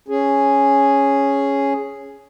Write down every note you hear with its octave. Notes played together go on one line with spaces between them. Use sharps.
C#4 G#4